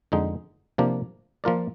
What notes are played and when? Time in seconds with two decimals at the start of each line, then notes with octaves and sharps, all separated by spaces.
0.12 F2 D3 G#3 D#4
0.78 C3 F3 A#3 D4
1.44 F3 A#3 F4 A#4 D5